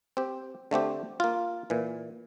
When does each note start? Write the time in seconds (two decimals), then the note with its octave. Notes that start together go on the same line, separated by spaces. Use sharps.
0.17 C4 G4
0.71 D3 A3 C4 G4
1.20 A#3 F4
1.70 A#2 E3